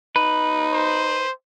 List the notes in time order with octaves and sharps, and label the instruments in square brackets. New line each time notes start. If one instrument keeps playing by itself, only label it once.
[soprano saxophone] D#4 [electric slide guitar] B4
[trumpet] C5